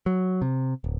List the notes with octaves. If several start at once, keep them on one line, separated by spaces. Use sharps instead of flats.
F#3
C3
D1